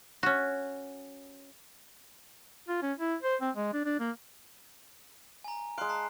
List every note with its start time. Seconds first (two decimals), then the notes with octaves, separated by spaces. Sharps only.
0.23 C#4 F#4
2.68 F4
2.82 C#4
2.98 E4
3.23 C5
3.41 C4
3.56 G#3
3.73 D4
3.85 D4
4.00 A#3
5.44 G#5 A#5
5.78 G#3 F5 C6 F#6 D7
5.89 A5 A#5 C7